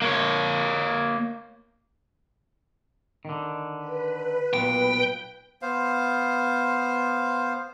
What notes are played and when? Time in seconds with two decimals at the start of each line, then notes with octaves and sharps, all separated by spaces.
0.02 A#3 C#5
3.25 D3 D#3
3.78 B4
4.54 B1 A#2 G5
5.62 B3 C5 F5